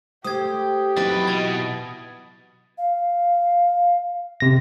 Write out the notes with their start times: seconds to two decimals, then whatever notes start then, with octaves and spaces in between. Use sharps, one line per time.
0.24 A3 G4 C5 D#6 G#6
0.97 F2 E3 F#3 D#4 B4 A6 D7
1.27 B2 G#6
2.78 F5
4.40 C3 A#6